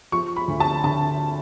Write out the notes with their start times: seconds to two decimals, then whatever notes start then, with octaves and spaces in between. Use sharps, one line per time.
0.12 F3 C#6
0.36 B5
0.48 D2
0.60 A5
0.84 D3 A5